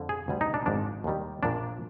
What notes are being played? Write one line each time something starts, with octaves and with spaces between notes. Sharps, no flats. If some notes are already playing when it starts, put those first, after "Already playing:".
Already playing: F2 D3 F3
G#4
D2 D3 G3
D#4
D4
G#1 G#2 F3 D4
D#2 D#3 G3
A#1 A#2 F3 D4